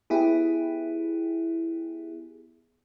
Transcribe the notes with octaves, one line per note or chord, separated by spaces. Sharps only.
B3 E4 G4 G#4